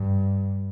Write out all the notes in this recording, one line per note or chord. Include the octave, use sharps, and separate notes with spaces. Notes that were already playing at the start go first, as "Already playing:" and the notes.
Already playing: G2